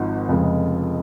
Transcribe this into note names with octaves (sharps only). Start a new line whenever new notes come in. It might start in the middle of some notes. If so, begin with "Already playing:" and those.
Already playing: G#1 G#2 F3
F1 F2 C#3 G#3